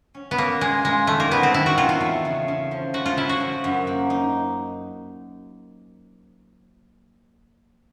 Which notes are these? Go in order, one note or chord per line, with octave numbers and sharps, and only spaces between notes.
C#4
B3
A#3 C#4
G#3 F4
G#3 F4
D#3 A3
A#3
F#3 B3
C4
D#3 E4
F#4
E2 F4
F4
A3
C#3
C#3
F3
F3 F#4
F4
F3 E4
F#4
F3
F#2
A#3
D#4